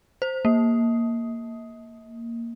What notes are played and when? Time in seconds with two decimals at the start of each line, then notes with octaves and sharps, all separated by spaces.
0.22 C5
0.45 A#3